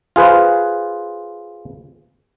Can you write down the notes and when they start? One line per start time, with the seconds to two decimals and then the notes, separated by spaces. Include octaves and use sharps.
0.16 F4 G#4 B4 C5